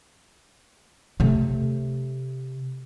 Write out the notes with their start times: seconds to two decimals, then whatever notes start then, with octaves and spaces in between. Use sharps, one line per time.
1.20 C3 A3